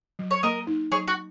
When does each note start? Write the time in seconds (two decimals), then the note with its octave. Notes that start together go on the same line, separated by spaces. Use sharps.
0.19 F#3
0.31 C#5
0.43 A#3 A#4 D#5
0.67 D#4
0.92 F#3 G#4 C#5
1.08 F#4